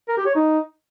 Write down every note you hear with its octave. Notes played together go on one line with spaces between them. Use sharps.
A#4
G4
C#5
D#4